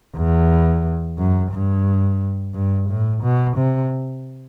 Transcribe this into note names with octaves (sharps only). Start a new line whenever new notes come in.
E2
F#2
G2
G2
A2
B2
C3